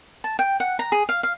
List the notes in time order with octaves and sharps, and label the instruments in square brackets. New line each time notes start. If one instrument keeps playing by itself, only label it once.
[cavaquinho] A5
G5
F#5
A#5
G#4
F5
F5